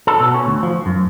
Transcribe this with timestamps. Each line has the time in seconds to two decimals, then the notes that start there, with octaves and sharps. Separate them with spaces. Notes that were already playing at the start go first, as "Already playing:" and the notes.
0.07 A4
0.20 B2
0.34 C#4
0.47 D2
0.63 F3
0.86 F#2